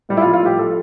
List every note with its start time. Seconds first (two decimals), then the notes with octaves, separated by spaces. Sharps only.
0.09 A2 G3
0.17 E4
0.21 F4
0.26 F3
0.33 F4
0.42 A2 G4
0.58 F3 A4